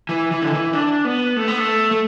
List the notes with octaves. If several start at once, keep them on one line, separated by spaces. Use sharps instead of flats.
E3
E3
D3
E3
D4
B3
A3
B3
A3
A3